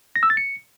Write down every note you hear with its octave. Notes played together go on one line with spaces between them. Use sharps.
A#6
E6
A6
C#7